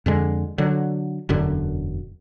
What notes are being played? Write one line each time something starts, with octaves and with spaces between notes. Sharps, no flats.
F2 D3 G#3
D3 F#3
E1 F#2 D3